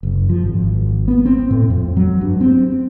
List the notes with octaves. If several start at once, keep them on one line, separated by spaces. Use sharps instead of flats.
F#1
F3
G#1
B3
C4
A2
F2
F#3
G2
C4